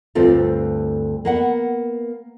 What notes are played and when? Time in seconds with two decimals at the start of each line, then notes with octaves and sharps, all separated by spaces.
0.15 D2 G2 C4 F4 A4
1.25 A#3 B3 F#5